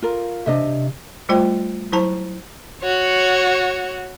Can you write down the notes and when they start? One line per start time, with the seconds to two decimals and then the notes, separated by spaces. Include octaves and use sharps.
0.02 F4 A#4
0.46 C3 D4 D#5 E5
1.29 G3 A3 F4 C5 G5
1.92 F#3 E4 C5 A5 A#5
2.82 F#4 C#5